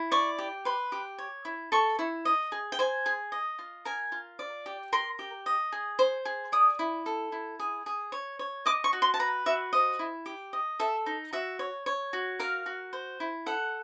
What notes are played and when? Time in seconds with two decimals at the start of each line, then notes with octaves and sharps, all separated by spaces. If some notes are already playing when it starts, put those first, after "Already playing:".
Already playing: E4
0.12 D5 C#6
0.39 G4
0.65 B4 C6
0.92 G4
1.18 C#5
1.45 E4
1.72 A4 C#6
1.99 E4
2.25 D#5
2.52 G#4
2.72 G5
2.79 C5 G#5
3.06 G#4
3.32 D#5
3.59 F4
3.85 A#4 G#5
4.12 F4
4.39 D5
4.66 G4
4.93 A#4 C6
5.19 G4
5.46 D#5
5.72 G#4
5.99 C5
6.25 G#4
6.52 D5 D#6
6.79 E4
7.06 A4
7.32 E4
7.60 G#4
7.86 G#4
8.12 C#5
8.39 C#5
8.66 D#5 D6
8.84 C#6
8.93 F#4
9.02 C6
9.14 A5
9.19 B4 A#5
9.46 F#4 E5
9.73 C5 D#5
9.99 E4
10.26 G4
10.53 D#5
10.80 A4 E5
11.06 D#4
11.33 F#4 E5
11.59 C#5
11.86 C#5
12.13 F#4
12.40 A#4 F5
12.66 F#4
12.93 C5
13.20 E4
13.46 A4 F#5